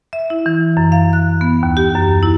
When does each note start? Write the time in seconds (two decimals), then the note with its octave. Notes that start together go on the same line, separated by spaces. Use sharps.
0.13 E5
0.30 E4
0.46 E3
0.77 F#2
0.92 F5
1.13 F#6
1.41 B3
1.63 D#2
1.77 G4
1.95 F#2
2.23 E4